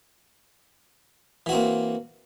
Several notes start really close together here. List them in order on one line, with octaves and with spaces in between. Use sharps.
E3 F#4 C4 A#3